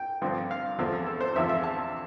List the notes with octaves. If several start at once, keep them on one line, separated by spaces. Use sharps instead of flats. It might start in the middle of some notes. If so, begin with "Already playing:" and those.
Already playing: G5
G2 D3 F3 C4
F5
E2 D3 F3 C4
A4
C5
E2 D3 F3 C4 E5
E5
A5